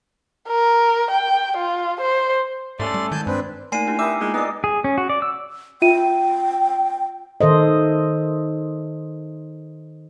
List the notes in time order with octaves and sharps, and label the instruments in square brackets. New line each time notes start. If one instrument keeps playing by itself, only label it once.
[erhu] A#4
G5
F4
C5
[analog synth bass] G#2 [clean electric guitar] A3 C#4 A4 [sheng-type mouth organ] D5 C6
[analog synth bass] G3
[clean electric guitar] G#2 [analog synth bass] D#3 [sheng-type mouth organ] G#5 A5 G6
[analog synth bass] G2 [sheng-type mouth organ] C4 D4 B4
[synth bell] A3 D#4 [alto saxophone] A#3 [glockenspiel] G#5 C7 D#7
[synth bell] D4 E4 G4
[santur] B3 A#4 G5 [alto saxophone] E5 [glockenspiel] D6 [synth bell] F6
[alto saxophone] G#3 [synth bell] A#3 D#4 F4
[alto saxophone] B3 [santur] D#4 G#4 D5 [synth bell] B4 E6
[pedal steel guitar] G#4
C#4
F#4
D5
E6
[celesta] F4 E5 D#7 [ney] G5
[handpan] D#3 A4 C5 D#5